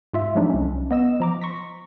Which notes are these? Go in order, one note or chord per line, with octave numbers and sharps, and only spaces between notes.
G#2 F4 E5
F3 F#3 G#3 A3 D4 D#4
C2 C#4
B3 D#5 E6 E7
F3 A#5 D6
C6 C#6 A#6 B6